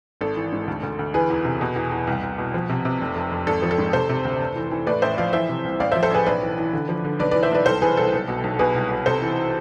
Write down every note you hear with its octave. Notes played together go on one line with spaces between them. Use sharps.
G#1 A4
E3
G#2
D2
D2
D2
E3 G#4 B4
E2
C3
B2
E2
E2
C2
C2
B2
F3
C3
C3
F1
F2
F2
G#1 A4
F3
A4
G#2
C3 A4 C5
C3
D2
F1
E3
E3
A2 B4 D5
A1 C5 E5
F3 D5 F5
E3 C5 E5
C3
C2
A1 D5 F5
C5 E5
F3
A4 C5
A1 G#4 B4
B1 B4 D5
E3
E3
D3
F3
D3
B1 B4 D5
B4 D5
E3
C5 E5
B1 B4 D5
C2 A4 C5
E3 G#4 B4
C2 A4
B1
B2
B1
B2 G#4 B4
C2
B2
C3 A4 C5
E3